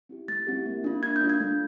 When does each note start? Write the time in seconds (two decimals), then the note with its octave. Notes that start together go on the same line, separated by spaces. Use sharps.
0.09 C4 E4 G4
0.28 A3 A6
0.47 C4 E4 G4
0.66 A#3
0.84 D4 F4
1.03 A#3 G#6
1.16 G6
1.21 D4 F4
1.29 G#6
1.40 A3